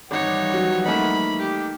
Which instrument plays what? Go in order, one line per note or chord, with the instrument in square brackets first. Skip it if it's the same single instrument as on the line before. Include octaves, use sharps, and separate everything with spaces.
[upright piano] G#1 [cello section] E3 F3 G3 [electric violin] D#4 C#5 [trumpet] F#5
[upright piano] F#3
[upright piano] A3 A#3 D#4 [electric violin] B5
[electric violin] G4